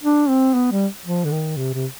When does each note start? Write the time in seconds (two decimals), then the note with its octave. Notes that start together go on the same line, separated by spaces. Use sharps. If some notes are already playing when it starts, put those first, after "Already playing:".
0.03 D4
0.29 C4
0.54 B3
0.71 G3
1.05 F3
1.25 D3
1.31 D#3
1.57 C3
1.74 C3